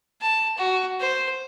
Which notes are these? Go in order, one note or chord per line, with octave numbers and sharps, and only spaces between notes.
A5
F#4
C5